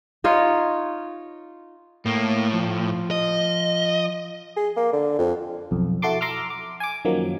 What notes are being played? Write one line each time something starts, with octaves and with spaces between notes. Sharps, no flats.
D#4 F4 C#5 D#5
A2 A#3
F3
D#5
G#4
A#3
D3
F2
B1 F2
E4 F#4 A4 A5 C6 D6
A#5 C6 D6 E6 F6
D6
G#5 D6
F#2 D#3 F3 F#3 A#3